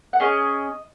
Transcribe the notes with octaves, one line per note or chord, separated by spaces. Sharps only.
F#5
C#4 G#4 D#5